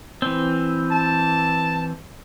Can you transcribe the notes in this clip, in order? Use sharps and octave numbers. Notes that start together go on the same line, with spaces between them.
E3 C4
A5